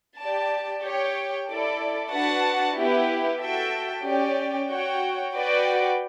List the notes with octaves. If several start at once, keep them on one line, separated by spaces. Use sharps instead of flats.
G4 D5 A5
G4 C#5 G5
E4 A4 D5
D4 F#4 B4 F#5 A5
B3 E4 G4 B4
F#4 A4 E5 G5
C#4 G4 D5 G5
F#4 C#5 G5
F#4 B4 D5 G5